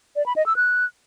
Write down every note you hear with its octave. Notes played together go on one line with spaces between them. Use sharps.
D5
B5
D#5
E6
F#6